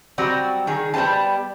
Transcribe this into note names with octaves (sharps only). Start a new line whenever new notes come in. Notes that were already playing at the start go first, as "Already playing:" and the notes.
F#3 G3 C4 F#4 D5
D#3 G#4
G3 B3 C5 G#5 A5